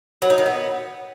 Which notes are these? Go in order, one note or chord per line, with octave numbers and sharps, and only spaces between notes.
F#3
D#4
D#3
B3